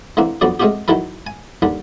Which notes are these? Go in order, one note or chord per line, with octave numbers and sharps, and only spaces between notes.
D3 E3 A#3 C4
F2 D3 F#3 B3 F#4 D5
G#3 A3 C4 C#4 F#4 G4
D#3 F#3 E4 A4 B4
G#5
D#2 D3 G3